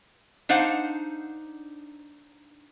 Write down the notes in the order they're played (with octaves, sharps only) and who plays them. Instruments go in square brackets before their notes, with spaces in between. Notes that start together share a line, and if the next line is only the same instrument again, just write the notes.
[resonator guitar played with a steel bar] D4 D#4 C5 F5 F#5